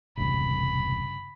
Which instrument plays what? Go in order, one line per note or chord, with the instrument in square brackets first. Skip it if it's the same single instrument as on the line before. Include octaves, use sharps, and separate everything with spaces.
[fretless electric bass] E1 C2 [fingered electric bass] G2 C#3 [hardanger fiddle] B5